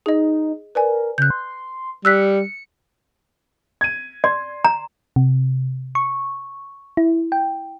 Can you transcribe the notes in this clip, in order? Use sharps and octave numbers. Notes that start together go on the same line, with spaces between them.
D#4 G#4 D#5
A#4 B4 D5 G#5
C#3 F#6 G6
C6
G3 E6 F#6 B6 C#7
G#6 D#7
D5 C6
A#5
C3
C#6
E4
G5